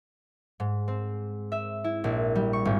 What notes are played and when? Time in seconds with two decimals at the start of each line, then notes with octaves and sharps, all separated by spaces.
0.60 G#2
0.88 C4
1.52 E5
1.84 E4
2.04 A#1
2.35 G3
2.53 C#6
2.65 G#1